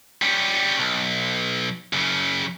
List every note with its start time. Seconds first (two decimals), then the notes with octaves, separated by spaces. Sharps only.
0.22 G3 C#4
0.79 B1
1.93 F#2 C#3